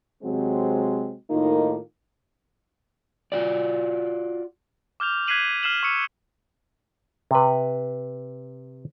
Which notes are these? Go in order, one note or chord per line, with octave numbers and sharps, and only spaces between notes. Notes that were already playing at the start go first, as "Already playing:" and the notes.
C3 F#3 G#3 C4
A2 D#3 A#3 D#4 F4
F4 F#4 D5
D6 F6 G6 F7
F#6 G#6 B6 C7 D#7 F#7
F6 C7 E7 F#7
C#6 E6 C#7 D#7
C3 B4